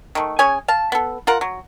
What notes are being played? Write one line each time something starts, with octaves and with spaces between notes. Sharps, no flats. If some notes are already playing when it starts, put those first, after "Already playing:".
D#3 A3
C#4 G#4 C#5 G#5
F5 A5
B3 A4
F4 A#4 F#5
F#3